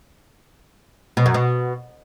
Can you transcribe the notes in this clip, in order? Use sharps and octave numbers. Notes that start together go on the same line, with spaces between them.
B2
F#2
B2